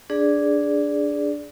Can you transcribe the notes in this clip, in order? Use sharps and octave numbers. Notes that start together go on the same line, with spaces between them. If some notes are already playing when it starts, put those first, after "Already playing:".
D4 G#4 D5